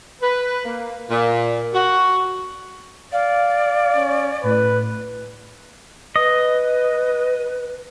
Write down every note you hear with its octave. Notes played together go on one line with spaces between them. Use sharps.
B4
A#3
A#2
F#4
D5 F5
C#4
A2 B4
B4 D#5